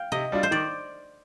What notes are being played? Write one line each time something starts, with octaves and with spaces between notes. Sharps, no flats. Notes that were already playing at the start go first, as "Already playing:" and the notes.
Already playing: F5 G5
C3 D#5
G3 D4 F4
C5
D#3 D5